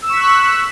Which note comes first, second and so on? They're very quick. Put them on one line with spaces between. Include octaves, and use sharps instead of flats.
E6 E7 C#6 B6 F#6